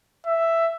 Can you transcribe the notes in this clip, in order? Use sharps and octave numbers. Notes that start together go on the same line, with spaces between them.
E5